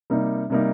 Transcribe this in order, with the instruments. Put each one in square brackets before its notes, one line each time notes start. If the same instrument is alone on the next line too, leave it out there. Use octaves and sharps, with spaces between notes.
[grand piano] C3 G3 A#3 D#4
C3 G3 A#3 D#4